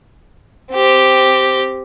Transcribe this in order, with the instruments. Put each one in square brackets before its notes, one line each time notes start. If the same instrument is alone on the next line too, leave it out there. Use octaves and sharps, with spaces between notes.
[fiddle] C4 G4